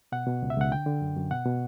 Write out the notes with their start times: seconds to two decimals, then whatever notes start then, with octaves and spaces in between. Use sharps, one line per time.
0.12 B2 F#5
0.27 B2
0.42 C#2
0.50 E5
0.58 C#2 F#5
0.71 D3 G5
0.86 D3
1.01 F#2
1.17 F#2
1.31 B2 F#5
1.45 B2